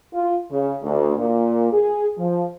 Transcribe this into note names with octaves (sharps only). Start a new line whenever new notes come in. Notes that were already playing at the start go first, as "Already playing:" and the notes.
F4
C#3
D2
A#2
G#4
F3